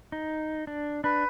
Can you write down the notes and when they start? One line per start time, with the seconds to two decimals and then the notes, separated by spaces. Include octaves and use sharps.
0.12 D#4
0.67 D4
1.04 D4 B4